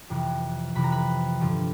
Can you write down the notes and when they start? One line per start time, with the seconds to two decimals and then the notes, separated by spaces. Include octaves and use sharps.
0.10 F2 C3 E3
0.75 F2 C3 E3 B5
0.84 A#5
0.92 B4 B5
1.40 G2 D3 F3